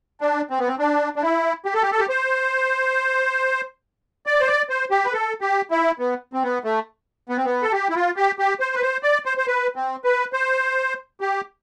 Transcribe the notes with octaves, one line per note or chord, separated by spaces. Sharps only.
D4
C4
B3
C4
D4
D4
E4
G4
A4
G4
A4
G4
C5
D5
C5
D5
C5
G4
B4
A4
G4
E4
B3
C4
B3
A3
B3
C4
B3
A4
G4
E4
F4
G4
G4
C5
B4
C5
D5
C5
C5
B4
C4
B4
C5
G4